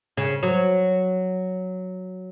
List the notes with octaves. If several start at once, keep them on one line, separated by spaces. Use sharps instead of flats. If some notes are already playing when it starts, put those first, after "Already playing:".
C#3
F#3